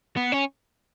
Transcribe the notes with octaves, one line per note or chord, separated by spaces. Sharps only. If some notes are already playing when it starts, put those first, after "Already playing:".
B3
C#4